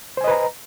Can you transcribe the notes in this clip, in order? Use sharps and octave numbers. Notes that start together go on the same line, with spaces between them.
B4 C5 D#5 G#5 A#5